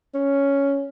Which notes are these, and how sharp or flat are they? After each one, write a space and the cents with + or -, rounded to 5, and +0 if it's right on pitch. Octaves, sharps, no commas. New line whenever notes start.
C#4 +5